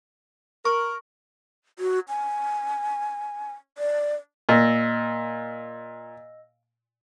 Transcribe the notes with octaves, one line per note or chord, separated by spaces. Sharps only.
A#4 C#6
F#4
G#5
D5
A#2 D#5 E6 A#6